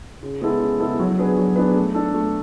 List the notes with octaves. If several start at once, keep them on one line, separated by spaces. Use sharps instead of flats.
C#3
G#3 B3 E4 A4
C#3
G#3 B3 E4 A4
F#3
B3 D4 G#4 B4
F#3
B3 D4 G#4 B4
A3
D4 A4
A3